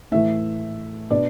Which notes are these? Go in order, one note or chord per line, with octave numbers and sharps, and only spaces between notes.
A2 E3 A3 E5
B2 B3 D4 D5